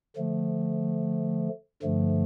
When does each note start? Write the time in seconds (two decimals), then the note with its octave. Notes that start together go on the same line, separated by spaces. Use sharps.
0.17 D3 F3 A3
1.82 G2 D3 F3 A3